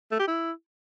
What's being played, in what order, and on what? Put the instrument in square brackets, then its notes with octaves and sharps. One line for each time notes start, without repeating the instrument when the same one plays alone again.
[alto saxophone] A3
G4
E4